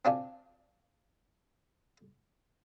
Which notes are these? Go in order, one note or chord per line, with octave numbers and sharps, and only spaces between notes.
C4 D4 F4 G#5